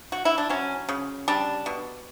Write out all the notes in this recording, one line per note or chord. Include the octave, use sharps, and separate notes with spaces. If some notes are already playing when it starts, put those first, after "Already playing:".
F#4
E4
D4
F#3 C#4
C#3
G3 D4
B2